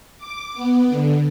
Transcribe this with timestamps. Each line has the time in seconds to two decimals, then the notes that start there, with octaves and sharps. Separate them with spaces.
0.18 D6
0.54 B3
0.87 D3